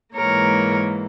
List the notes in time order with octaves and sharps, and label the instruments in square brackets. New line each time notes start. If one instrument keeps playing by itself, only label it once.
[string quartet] G#2 E3 A#3 A#4 C#5